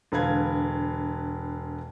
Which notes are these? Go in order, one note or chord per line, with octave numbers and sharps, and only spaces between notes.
E1 D3 B4 F5 G#6